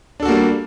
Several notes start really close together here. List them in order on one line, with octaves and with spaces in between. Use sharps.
D4 A4 F#4 A#3 G3